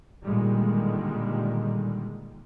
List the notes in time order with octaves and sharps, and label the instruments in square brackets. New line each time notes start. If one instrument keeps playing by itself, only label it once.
[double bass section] A#2 D3 D#3 G3 G#3